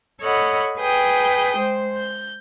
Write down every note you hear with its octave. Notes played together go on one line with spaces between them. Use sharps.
A4 C#5 D#5 F#5 B5
G#4 B4 G5 D#6 G6
G#3 C5
G6